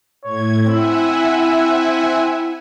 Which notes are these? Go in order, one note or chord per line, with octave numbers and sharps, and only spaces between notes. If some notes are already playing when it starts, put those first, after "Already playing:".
A2 C#5 G#6
C4 E4 E5 F#5 G#5